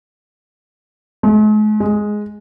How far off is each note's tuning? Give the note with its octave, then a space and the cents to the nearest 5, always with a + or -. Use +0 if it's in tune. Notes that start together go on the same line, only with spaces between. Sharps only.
G#3 +45
G#3 +5